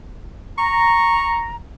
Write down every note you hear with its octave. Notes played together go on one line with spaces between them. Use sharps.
A#5 C#6